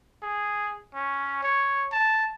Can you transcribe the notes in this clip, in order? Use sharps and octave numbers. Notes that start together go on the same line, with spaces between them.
G#4
C#4
C#5
A5